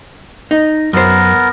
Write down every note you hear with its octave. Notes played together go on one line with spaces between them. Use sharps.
D#4
F#2 B3 A#4 C5